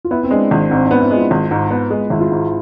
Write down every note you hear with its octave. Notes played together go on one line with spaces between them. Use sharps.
F4
B3 E4
C4
G#3 D4
G#1 D4
G#2 C4
D4
B3
E4
G#3
F4
G#1
G#2
B3
G#3 G#4
G#1 E4
F4
G#2